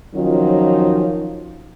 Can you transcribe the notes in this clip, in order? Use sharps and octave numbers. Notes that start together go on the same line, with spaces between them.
D#3 F3 F#3 C#4 D#4 F4